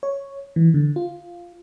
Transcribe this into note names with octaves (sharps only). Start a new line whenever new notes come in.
C#5
E3
D3
F4